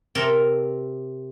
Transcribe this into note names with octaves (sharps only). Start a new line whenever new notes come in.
C3 C4 A4 A#4